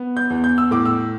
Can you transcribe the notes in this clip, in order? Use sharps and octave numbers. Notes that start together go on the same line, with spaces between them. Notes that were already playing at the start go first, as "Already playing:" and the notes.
Already playing: B3
G6
E2
G6
E6
A2 D6
E6